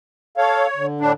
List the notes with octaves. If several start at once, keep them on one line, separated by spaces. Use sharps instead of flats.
A4 C#5 F5
D3
A2 D4